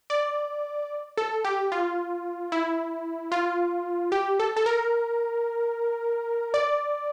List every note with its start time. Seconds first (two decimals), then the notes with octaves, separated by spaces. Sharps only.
0.10 D5
1.17 A4
1.45 G4
1.72 F4
2.52 E4
3.32 F4
4.12 G4
4.40 A4
4.56 A4
4.66 A#4
6.54 D5